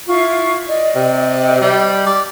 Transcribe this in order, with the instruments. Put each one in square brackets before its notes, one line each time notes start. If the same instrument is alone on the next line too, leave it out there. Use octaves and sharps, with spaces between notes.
[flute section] E4 F4 C#6
D5 D#5
[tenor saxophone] C3
G3
D5